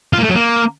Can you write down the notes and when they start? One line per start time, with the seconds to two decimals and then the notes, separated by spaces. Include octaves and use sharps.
0.13 F4
0.19 A#3
0.24 A3
0.29 F#3
0.35 A#3